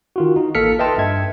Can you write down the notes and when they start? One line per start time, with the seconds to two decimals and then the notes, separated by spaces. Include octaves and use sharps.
0.16 D#3 F4 F#4
0.36 D#4
0.55 A1 A#3 A4 F6 B6 C#7
0.79 B4 D#5 E5 G5 A5 C6
0.98 G2 E5 G#6